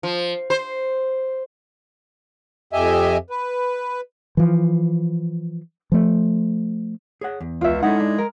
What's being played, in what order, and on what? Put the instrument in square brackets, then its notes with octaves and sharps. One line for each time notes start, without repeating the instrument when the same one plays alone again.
[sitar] F3
C5
[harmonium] F2 G4 D#5 E5 G#5
B4
[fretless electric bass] E3 F3
F3 A3
[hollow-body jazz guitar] G#4 C#5 F#5
E2
[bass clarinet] C#2 [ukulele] F4 E5
[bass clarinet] G#3 [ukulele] C#4 F#5 [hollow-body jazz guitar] D#4 E4 A4
[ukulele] D4
A#4